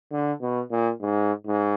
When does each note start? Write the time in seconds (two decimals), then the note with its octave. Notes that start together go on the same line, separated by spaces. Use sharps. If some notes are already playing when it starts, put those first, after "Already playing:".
0.11 D3
0.41 B2
0.71 A#2
1.01 G#2
1.46 G#2